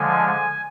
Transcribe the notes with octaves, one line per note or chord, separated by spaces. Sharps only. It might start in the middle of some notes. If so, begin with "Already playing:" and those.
Already playing: D3 F3 G#3 G#5